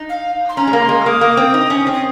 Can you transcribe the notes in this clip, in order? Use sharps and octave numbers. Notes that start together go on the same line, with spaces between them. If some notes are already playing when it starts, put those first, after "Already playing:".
Already playing: D#4
F5
C6
C#4 A#5
G#3
A#3
C6
G#3
F6
A#3 D#6
A#3
C4
D#4
C#4
C4
D#6